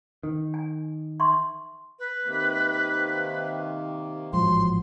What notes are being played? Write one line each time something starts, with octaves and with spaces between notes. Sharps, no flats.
D#3
G#5
E5 C6 C#6
B4
C3 D#3 A#3
A1 G#2 F3 F#3 C6